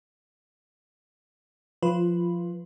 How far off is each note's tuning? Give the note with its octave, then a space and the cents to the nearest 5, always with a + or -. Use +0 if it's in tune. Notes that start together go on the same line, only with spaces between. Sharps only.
F3 +5 F4 -20 B4 +0